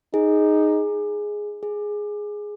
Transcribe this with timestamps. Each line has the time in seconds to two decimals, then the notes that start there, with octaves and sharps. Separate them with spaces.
0.14 D#4 G#4
1.63 G#4